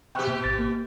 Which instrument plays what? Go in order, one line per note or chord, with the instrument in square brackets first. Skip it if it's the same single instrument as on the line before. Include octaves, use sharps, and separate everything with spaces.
[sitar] B2 G4 [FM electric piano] G5 C#6 F#6
[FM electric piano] A#2
G#1 A6
A#3